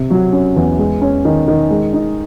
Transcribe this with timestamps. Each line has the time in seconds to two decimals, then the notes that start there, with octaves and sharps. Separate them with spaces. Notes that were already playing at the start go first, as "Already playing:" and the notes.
Already playing: C3
0.10 F#3
0.33 C#4
0.56 E2
0.78 G#3
1.02 C#4
1.25 D#3
1.48 D#3
1.70 G#3
1.93 D#4